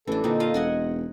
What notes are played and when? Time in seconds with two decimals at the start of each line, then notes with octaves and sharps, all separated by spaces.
0.07 A1 E3 D4 A4
0.24 A#2 D3 C4 D#4
0.40 F4 D#5 F5
0.54 E1 D#5 F#5 G#5